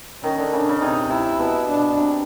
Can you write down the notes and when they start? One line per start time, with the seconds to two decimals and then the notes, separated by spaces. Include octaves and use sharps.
0.23 D#3 C#4
0.39 D3
0.53 C#3 D4
0.69 C#3
0.82 C3 D#4
1.10 C3 E4
1.39 B2
1.68 D4
1.97 C3